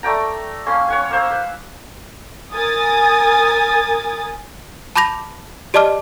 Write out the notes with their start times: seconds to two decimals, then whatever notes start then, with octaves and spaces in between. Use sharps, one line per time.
0.03 A3 D5 G5 A#5
0.66 A#3 C#4 C6
0.88 C#5 F#5 G#5
1.11 A#3 C5 E6
1.30 B4
2.54 A#4 G#5 D#6 A6
4.96 A5 B5 D6 G6 A#6 F7
5.74 G4 D5 D#5 A5 D6 F6